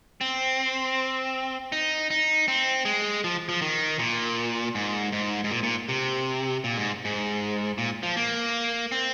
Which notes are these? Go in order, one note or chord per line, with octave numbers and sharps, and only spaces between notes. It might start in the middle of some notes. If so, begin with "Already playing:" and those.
C4
D#4
D#4
C4
G#3
F3
F3
D#3
A#2
G#2
G#2
G#2
A#2
A#2
C3
A#2
G#2
G#2
A#2
F3
A#3
C4